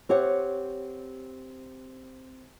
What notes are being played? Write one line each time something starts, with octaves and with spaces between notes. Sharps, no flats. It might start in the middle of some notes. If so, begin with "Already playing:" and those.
C4 G4 C#5 F#5